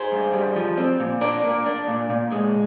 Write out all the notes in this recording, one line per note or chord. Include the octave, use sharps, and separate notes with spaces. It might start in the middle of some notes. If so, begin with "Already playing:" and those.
Already playing: G#4 C5
G2
G3
F3
C4
A#2
D4 A#4 D5
A#3
D4
A#2
A#2
G#3